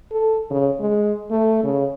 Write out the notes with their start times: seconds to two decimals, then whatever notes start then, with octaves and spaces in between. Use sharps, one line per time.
0.12 A4
0.51 C#3
0.80 G#3
1.31 A3
1.64 C#3